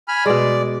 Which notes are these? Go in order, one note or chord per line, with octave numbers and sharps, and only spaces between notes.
G#5 B5 F6
B2 G#3 D5